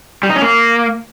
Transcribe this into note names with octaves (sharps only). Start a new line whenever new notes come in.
G3
D#4
C#4
A#3